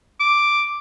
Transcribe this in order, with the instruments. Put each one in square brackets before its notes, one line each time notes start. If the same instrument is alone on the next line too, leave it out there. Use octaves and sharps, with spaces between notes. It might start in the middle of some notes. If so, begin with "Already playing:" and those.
[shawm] D6